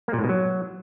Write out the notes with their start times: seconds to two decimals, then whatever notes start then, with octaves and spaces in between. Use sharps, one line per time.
0.08 A#3
0.13 A#2
0.19 A2
0.24 B2
0.29 F#3